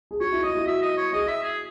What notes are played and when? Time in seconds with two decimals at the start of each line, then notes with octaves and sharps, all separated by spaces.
0.11 G#4
0.21 F#4 C#5
0.32 E4
0.43 E4 D#5
0.55 F#4
0.67 E5
0.82 D#5
0.97 C#5
1.13 G#4 D#5
1.28 E5
1.43 G#4